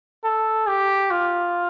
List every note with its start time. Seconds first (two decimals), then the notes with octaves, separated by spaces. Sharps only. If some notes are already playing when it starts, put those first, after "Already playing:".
0.24 A4
0.67 G4
1.11 F4